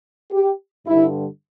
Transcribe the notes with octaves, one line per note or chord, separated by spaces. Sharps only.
G4
G2 D3 G3 E4